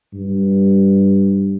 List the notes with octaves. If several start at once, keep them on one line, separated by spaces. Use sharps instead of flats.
G2